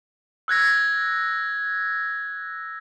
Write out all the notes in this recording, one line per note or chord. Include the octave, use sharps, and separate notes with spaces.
E6 F#6 G#6 A#6